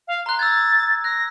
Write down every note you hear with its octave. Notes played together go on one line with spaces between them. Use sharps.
F5
A#5 C6 F#6
E6 F#6 G#6 A6
F#6 A#6